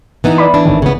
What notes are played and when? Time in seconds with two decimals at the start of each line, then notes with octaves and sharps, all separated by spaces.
0.24 E3 B3 D#4
0.38 D5 B5
0.54 E3 D4
0.66 G#1 A2 D#3
0.82 C#3 B3